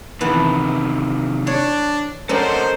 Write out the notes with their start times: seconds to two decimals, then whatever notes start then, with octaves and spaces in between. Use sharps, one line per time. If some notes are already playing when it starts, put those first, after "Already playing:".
0.21 C3 D#3 E3 B3 A5
1.47 D4 C#5
2.29 C#4 A4 A#4 C5 D5 D#5 F#5